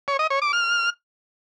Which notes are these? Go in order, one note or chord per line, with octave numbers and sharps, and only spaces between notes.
C#5
D#5
C#5
D6
F6